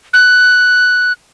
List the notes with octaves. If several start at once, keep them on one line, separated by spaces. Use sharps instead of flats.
F#6